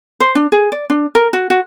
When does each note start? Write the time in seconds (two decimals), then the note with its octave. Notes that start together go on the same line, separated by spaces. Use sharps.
0.20 C5
0.35 D4
0.52 G#4
0.72 D5
0.90 D4
1.15 A#4
1.33 F#4
1.50 F#4